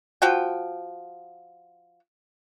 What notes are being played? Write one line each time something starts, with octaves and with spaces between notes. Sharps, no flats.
F3 F#4 G5